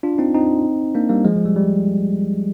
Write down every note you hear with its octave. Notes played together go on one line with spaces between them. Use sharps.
D4 F4
C4 D#4
C4 D#4
A#3 D4
G3 A#3
F3 G#3
F3
G3
G3